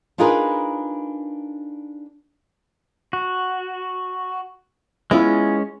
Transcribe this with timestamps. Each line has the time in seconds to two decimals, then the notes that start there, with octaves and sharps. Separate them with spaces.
0.18 D4 D#4 F4 G#4 A#4 B4
3.13 F#4
5.11 G#3 B3 C#4 E4 F4